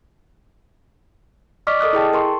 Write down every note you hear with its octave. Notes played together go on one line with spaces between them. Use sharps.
D5 D#5 C#6 D6 F6 B6
A4 A#4 D#5 D#6 F6 F#6
E4 G#4 G5 A5
A#4 C6 C#6